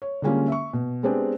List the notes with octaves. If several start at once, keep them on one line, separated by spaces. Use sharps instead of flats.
C#5
D3 G3 G#3 A#3 C#4 F4
E5 C#6
B2
G#3 B3 C4 D4 G4 G#4